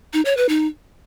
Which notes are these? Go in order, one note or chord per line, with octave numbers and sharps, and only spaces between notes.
D#4
C#5
B4
D#4